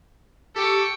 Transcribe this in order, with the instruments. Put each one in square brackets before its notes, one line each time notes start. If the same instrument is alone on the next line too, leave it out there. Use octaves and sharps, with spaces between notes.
[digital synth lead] G4 [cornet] A4 [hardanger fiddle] G5 C#6